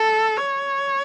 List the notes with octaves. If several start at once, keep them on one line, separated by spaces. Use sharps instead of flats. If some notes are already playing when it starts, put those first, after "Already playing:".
Already playing: A4
C#5